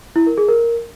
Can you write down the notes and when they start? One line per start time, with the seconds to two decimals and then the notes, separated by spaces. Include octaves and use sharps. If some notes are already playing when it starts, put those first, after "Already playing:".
0.16 E4
0.27 A#4
0.38 G#4
0.49 A#4